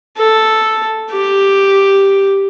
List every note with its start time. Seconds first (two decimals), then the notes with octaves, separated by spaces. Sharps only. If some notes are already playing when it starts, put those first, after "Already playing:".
0.18 A4
1.11 G4